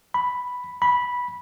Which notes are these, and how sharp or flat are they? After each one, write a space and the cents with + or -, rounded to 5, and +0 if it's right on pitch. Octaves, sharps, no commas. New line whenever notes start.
B5 +0
B5 -10